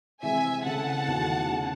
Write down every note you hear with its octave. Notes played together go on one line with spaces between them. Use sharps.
C3 E3 G#3 C4 E5 G#5
C#3 G#3 C4 E4 A4 F#5 A5
E2 C3 D#3 F#3 A3
C#3